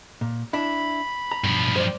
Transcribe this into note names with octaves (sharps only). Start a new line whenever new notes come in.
A#2
D4 E4 B5
A#5
G2 B2 F3
C5 D5